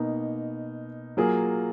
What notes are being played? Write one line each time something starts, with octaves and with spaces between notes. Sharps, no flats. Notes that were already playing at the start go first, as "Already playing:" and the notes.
Already playing: B2 A#3 D#4
F#3 A#3 F4 G#4